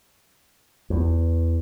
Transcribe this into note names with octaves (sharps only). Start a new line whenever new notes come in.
E2